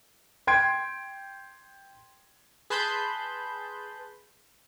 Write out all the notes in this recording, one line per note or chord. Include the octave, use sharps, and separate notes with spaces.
G5 C6 G#6 C7 D7
G#4 B4 A5 B5 C6 G6